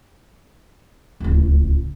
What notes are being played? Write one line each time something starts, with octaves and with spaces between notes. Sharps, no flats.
D1 C#2